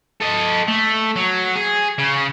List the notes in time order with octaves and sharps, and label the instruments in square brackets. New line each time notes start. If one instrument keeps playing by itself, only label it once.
[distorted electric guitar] A4 D#5
A3
F#3
G#4
C#3